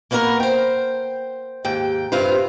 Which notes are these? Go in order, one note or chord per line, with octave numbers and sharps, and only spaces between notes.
A#3 B3 F#4 A4 A#4
C5 G5
D#2 G#2 G5
G2 C3 F4 B4 C5